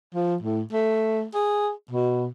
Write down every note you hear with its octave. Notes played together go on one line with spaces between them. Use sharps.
F3
A2
A3
G#4
B2